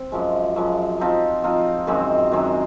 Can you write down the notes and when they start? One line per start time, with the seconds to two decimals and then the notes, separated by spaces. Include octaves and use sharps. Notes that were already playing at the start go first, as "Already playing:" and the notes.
Already playing: C4
0.12 F#2 F3 G#3
0.56 F#2 F3 G#3
1.00 F3 C4 D#4
1.44 F3 C4 D#4
1.87 F#2 D#3 G#3 C4
2.31 F#2 D#3 G#3 C4